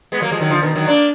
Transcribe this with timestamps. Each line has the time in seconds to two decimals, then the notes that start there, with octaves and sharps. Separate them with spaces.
0.12 G#3 B3
0.22 F#3 A#3
0.32 F3 G#3
0.40 D#3 F#3
0.50 D3 F3
0.62 B2 D#3
0.75 D#3 F#3
0.88 A#3 D4